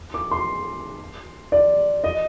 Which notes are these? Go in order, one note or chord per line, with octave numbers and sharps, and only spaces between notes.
D6
C6
D5
D#5